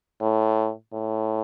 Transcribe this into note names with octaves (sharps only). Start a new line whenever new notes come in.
A2
A2